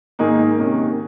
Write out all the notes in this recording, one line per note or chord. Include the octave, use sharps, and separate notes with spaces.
G#2 D#3 A#3 D#4 G#4
C3 D#3 A#3 C#4